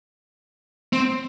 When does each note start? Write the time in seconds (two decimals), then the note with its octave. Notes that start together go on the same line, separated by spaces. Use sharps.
0.93 C4